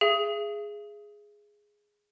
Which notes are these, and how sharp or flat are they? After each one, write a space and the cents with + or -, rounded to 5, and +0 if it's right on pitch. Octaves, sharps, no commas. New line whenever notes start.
G#4 +0 E5 +40